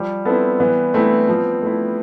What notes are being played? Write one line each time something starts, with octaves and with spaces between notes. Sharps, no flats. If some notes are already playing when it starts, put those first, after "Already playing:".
Already playing: F3 G3
B3 C4 E4 A4
E3 B3
A3 C4 E4
F3
A3 E4